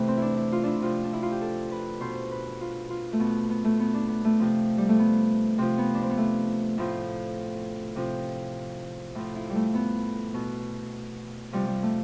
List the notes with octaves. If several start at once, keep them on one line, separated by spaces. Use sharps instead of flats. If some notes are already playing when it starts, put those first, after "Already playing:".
Already playing: C3 E3 A3
C4
D4 E4
E4
F4
D4 E4
C3 F3 F4
D4
E4
F4
G4
A4
B4
B2 C5
B4
F4
F4
A3
B2 B3
B3
A3
B3
D4
B3
A3
C3 F3
G3
A3
B3
C3 F3 C4
B3
D4
C4
B3
A3
A2 F3
C3 F3 C4
A2 F3
E4
G3
A3
B3
B2
C3 F3 G3
G3
A3